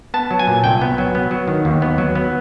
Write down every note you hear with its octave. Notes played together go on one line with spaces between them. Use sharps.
B3 A5
F#3
G#5
A#2
C2 G5
B3
F#3
B3
F#3
D#3
D#2
B3
F#3
B3